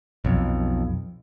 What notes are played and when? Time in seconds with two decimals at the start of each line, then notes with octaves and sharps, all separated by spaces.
0.25 B1 F2